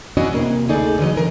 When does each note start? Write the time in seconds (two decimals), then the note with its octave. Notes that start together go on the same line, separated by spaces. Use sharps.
0.17 C#4 D4 E4 F#4 D5 D#5
0.34 C3 A#3
0.68 D2 A3 D#4 G#4 D5
0.99 D3 E3 F#3 D#5
1.16 C3 A#4